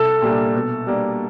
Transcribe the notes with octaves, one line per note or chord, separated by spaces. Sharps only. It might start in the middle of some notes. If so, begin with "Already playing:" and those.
Already playing: C2 A4
A#2 G3 A#3 D4
B2
G3 A#3 D4